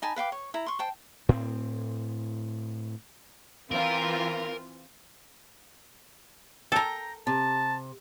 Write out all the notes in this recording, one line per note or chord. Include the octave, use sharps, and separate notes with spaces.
D#4 G#5 A5 B5
B4 F5 G5 D6
C#5
E4 A#5
C6 C#6
C5 G5 A5
A2 C4
E3 C4 F4 A#4
A4 A#4 G5 A#5
C3 A5